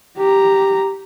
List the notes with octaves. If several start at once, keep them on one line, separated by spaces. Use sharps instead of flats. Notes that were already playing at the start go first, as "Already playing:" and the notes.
G4 A#5